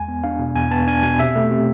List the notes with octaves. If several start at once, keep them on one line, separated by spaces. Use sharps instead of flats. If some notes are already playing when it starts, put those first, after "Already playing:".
Already playing: E2 G#3 G#5
B3
D4 F5
B2
E2 G#5
B3 A5
D4 G#5
B2 G#5
C3 E5
A3
C3